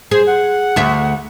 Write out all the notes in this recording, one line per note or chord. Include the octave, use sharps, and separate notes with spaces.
G#4 C5
F#5
D2 E5